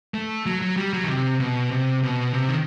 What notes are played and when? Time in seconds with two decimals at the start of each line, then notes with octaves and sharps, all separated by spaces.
0.14 A3
0.46 F#3
0.62 F#3
0.77 G3
0.93 F#3
1.04 D#3
1.08 C3
1.40 B2
1.71 C3
2.03 B2
2.34 C3
2.48 D#3